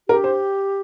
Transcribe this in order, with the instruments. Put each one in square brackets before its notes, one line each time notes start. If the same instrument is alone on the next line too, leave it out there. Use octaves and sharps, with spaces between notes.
[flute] G4 [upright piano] A#4
[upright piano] C5